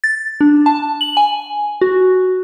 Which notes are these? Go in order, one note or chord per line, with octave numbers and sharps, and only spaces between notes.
A6
D4
A5
F#7
G#5
F#4